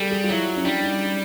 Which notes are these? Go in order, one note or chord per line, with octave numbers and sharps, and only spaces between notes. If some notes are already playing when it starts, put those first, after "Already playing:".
Already playing: G3 G#4 A4
G#4
F4
F#3 E4
C#4
G3 D4
D#4